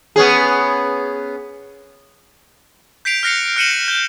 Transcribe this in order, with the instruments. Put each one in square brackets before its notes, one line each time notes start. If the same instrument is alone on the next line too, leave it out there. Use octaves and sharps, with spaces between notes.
[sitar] B3 C#4 G#4
[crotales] G6 B6 C7 D7 F7
F6 F#6 A#6 C7 C#7 F7
F6 F#6 C#7 D#7 E7 F#7
A#6
G6 G7